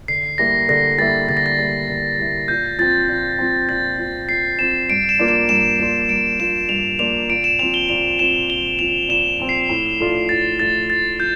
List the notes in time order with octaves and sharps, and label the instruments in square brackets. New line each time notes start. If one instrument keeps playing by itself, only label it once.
[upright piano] D3 [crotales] C7
[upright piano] G3 A#3 E4 [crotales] A#6
[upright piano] D3 [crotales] A#6
[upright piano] G3 A#3 E4 [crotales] A6
[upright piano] D3 [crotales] A6
[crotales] A#6
A6
[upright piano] G3 A#3 E4
D3
G3 A#3 E4
[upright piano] A#2 [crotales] G6
[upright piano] F3 C4 [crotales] A6
[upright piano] A#2
F3 C4
[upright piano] A#2 [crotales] A6
[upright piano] F3 C4
[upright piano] A#2 [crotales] C7
[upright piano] F3 C4 [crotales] E7
[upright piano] G2 [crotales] D7
[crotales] E7
[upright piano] F3 A#3 D4 F4
[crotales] E7
[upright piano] G2 [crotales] E7
[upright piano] F3 A#3 D4 F4
[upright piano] G2 [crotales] D7
[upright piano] F3 A#3 D4 F4 [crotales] E7
[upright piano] G2 [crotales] F7
[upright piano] F3 A#3 D4 F4 [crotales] F7
[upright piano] A#2 [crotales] D7
[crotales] E7
[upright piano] C4 [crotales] F7
[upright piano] F3
[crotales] G7
[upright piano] A#2 [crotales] F7
[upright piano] F3 C4 [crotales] E7
[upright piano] A#2 [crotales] G7
[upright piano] F3 C4 [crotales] F7
[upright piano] A#2 [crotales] E7
[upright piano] F3 C4
[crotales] C7
[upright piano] A2
F3 A3 D4 F4
[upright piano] A2 [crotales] A6
[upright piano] F3 A3 D4 F4 [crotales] A6
[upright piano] A2 [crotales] A6
[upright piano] F3 [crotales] G6